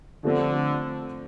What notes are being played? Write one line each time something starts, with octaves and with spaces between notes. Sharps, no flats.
D3 F3 A3 C4